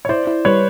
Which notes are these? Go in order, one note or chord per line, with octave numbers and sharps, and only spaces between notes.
C#5
E4 C5 D5
E4
G3 B4 C#5